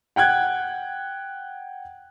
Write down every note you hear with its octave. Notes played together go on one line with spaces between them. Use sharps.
F#5 G5 F#6 G#6